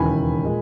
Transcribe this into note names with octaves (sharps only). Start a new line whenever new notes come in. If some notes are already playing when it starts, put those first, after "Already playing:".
Already playing: E1 D#2 C#3 E3 G#5 B5
A#2 G#3